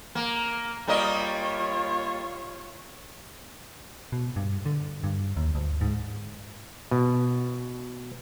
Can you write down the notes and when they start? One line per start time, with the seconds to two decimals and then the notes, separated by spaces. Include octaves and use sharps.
0.15 A#3
0.87 G3 A#3 F4 C#5 D#5
4.12 B2
4.36 G2
4.66 D3
5.04 G2
5.36 D#2
5.55 D2
5.81 G#2
6.91 B2